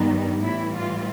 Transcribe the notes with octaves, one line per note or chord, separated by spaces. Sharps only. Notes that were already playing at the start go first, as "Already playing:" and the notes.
Already playing: G2 D#3 G3 B3 D#4
A2 E3 G3 E4
F4